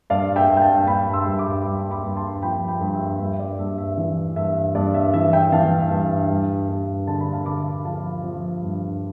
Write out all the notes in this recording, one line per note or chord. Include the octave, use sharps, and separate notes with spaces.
G2 D5 F5
E5 G5
G2
G5
F5 A5
G2 G5 B5
C6 E6
G2
B5 D6
G2
B5 D6
G2
A5 C6
F3 G5 B5
G5 B5
G2
E5 G5
G2 E5
D5
G2 E5
E5
E3
G2 E5
G2 D5
E5
E3 E5
E5 G5
E3 F5 A5
G2
G2
G2
D3 A5
B5
F5 A5
D3 B5 D6
F3 F5 A5
F3
G2